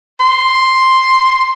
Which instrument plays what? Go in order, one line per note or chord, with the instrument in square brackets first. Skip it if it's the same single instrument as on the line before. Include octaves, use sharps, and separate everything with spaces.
[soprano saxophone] C6